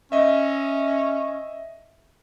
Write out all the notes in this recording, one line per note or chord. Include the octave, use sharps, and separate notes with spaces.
C#4 D#5 E5